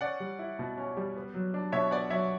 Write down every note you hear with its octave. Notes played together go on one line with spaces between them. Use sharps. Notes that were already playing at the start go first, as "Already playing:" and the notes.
C#4 D5 F#5
G3
E4
B2
C#4
G3
B3
F#3
D4
B2 C#5 E5
B3 D5 F#5
F#3 C#5 E5